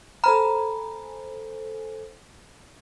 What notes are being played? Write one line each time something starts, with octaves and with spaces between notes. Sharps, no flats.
A4 C5 G#5 A#5 B5 F6